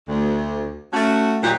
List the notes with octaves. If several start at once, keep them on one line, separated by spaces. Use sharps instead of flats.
D2
A3 C#4 F#4
D#2 A#2 F#3 D#4 G4 F#5